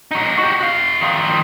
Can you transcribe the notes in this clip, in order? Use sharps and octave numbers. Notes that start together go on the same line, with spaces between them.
D#4 F#4
F#4 G4
F#4 F5
D#3 F3